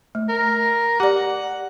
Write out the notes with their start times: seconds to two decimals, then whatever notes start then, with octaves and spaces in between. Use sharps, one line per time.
0.15 A3
0.29 A#4
1.00 G4 D5 F#5